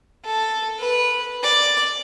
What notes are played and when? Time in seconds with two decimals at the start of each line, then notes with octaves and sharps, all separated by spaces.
0.24 A4
0.79 B4
1.43 D5